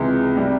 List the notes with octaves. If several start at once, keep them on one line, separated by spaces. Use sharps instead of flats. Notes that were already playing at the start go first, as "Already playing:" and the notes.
Already playing: C#2 C3 E3 G#3
C3 G3